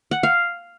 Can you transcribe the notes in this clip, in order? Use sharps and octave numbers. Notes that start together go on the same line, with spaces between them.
F#5
F5